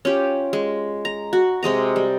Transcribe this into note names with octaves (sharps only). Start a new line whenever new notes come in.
C#4 F4 G4
G#3
A#5
F#4
C3 G#3 D#5 A#5
G3